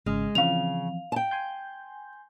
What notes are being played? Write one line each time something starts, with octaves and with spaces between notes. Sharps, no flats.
G#1 C#3 G#3 F6
C#3 E3 F3 C4 F5 F7
G5 A5
G#5 C6 G6